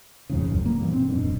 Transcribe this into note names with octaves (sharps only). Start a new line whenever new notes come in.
E1 F2 G#2 C#3
D1 C#2 F#2
A#3 B3
G2 B2 E3
C4
D#1 F#2 B2 D4